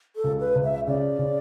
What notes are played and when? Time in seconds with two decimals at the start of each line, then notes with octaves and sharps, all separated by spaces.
0.16 A4
0.24 C#2
0.40 B4
0.55 C#2
0.64 E5
0.87 C#3 D5
1.19 C#3